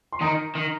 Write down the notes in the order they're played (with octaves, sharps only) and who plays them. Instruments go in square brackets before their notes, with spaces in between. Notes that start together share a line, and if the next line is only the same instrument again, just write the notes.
[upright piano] C6
[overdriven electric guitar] D#3 [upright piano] A#5 D#6
[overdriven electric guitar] D#3